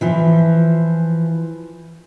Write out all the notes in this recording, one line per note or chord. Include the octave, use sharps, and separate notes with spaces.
E3 F3